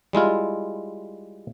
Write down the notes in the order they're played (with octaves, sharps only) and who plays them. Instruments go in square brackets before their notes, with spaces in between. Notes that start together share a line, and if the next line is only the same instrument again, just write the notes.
[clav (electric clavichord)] G3 G#3 E4 F4